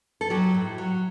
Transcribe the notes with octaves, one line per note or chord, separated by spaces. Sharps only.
A4
F#3 G4
A2
F#3